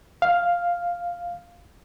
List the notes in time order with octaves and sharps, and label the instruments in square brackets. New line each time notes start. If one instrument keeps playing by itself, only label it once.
[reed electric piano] F5